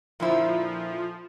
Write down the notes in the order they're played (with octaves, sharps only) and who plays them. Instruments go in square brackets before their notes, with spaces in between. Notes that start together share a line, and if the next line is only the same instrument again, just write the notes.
[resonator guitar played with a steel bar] A#2 D3 E4 [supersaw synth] F3